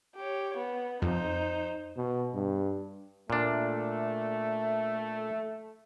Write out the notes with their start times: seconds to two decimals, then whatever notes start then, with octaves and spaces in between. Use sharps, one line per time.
0.16 G4 C#5
0.57 B3
1.02 F2 D#4 C5
1.97 B2
2.34 G2
3.30 A#2 A3 D4